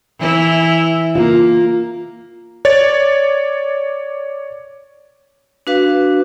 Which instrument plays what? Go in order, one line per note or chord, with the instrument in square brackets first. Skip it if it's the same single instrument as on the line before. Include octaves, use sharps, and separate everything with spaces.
[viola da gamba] E3 E4
[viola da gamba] A#3 [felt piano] F4
[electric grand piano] C#5 D5 A6
[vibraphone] D4 F#4 B4 F5